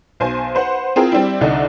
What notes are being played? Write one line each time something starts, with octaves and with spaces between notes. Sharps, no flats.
B1 C5 G#5
B4 C5 F#5
C4 E4 F4 G#4 A#4
G3 C4 D4 E4
C2 D3 D4 D#4 A4 F#5